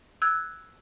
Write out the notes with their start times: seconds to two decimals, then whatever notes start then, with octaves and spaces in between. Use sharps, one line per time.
0.22 E6 F#6 G#6